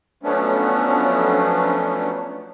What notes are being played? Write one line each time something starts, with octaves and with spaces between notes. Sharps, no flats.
F3 F#3 A3 B3 C#4 D4